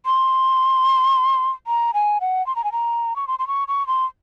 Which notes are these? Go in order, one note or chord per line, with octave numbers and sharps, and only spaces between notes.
C6
A#5
G#5
F#5
C6
A#5
G#5
A#5
C#6
C6
C6
C#6
C#6
C6